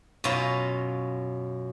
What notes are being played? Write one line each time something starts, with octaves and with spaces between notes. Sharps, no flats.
F#2 B2 C#4 F4 F5 A#5